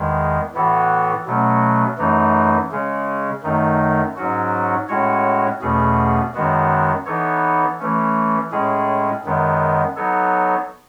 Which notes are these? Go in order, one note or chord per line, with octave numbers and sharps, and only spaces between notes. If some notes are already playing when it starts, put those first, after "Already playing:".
Already playing: E2 D#3 G#3
A2 E3 B3 F#4 A4
B2 F#3 A3 C#4
F#2 E3 A3 D#4
C#3 G#3 C#4
F#2 D#3 A3 D#4
G#2 F#3 C#4 F#4
A2 G#3 C#4 F#4 C#5
E2 B2 A3 C#4 G#4
F#2 D#3 G#3 B3 F#4
E3 B3 D#4 A4 C#5
E3 A3 C#4
A2 G#3 C#4 G#4
F#2 D#3 G#3 B3
F#3 B3 D#4 A4 C#5